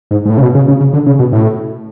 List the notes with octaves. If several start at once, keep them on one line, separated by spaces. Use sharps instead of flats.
G#2
G#2
A2
C#3
B2
C#3
C#3
C#3
D3
C#3
B2
A2